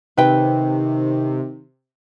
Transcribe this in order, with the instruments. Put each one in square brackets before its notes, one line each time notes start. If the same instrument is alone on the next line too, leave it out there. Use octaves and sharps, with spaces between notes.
[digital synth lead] C3 [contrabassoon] D#3 [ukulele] B4 G5